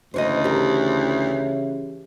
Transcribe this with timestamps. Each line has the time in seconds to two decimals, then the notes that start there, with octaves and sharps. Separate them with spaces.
0.14 D2 C#3 E3 C5 C#5 D#5
0.44 G4 A#4